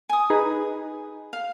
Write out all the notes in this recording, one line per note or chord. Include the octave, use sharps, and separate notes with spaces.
G#5 D#6
D#4 G#4 B4
F5